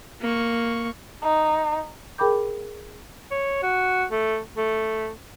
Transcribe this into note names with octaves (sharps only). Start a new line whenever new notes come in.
A#3 C#6
D#4
G#4 A#4 G5 B5 D6 G6
C#5
F#4
A3
A3